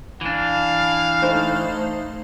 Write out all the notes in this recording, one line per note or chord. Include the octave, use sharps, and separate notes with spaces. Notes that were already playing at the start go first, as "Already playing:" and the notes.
E3 D4 F5
A3 D#4 C5